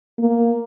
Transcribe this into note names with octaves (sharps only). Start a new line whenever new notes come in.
A#3